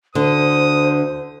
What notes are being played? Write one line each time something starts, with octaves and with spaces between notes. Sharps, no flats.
D2 D3 C5 D#6